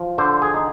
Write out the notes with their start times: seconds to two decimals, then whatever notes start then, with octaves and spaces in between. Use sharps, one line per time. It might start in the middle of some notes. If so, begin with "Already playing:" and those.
Already playing: F3
0.18 D3 C5
0.42 G#4
0.54 D#4